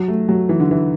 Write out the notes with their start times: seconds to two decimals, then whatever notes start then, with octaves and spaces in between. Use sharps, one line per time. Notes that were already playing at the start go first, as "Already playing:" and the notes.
Already playing: F#3
0.08 A3
0.29 F#3
0.49 E3
0.60 D3
0.71 E3